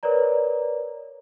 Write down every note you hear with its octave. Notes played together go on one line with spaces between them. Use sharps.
A#4 B4 C#5 D5 A#5